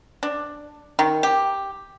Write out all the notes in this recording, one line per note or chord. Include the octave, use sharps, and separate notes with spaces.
D4
D#3
G4